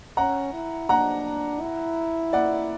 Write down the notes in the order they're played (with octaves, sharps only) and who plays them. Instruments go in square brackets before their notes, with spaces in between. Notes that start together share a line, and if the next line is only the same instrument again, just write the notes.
[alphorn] C#4 [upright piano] F#5 A#5
[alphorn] E4
[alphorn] D4 [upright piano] F#5 A#5
[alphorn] E4
[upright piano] D5 F#5